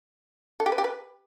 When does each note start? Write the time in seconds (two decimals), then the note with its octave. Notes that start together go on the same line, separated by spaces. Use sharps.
0.60 A4
0.66 G4
0.72 B4
0.78 G4
0.84 B4